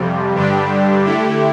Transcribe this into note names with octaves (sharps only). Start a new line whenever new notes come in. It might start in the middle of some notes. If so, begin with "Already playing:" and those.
Already playing: F2 C3 G3
G2 D3 G3 D4 G4
D3 A3 E4 G4